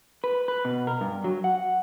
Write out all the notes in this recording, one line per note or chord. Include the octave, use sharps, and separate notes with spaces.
B4
B4
B2
A#4
G2
F#3
F#5